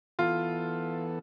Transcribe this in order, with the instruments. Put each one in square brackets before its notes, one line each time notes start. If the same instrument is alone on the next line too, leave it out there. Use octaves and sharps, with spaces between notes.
[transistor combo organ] E3 B3 A4 [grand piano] F4